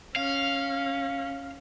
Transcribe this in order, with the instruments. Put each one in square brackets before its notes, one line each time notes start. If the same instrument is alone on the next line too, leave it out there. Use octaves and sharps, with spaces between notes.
[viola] C#4 [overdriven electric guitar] F5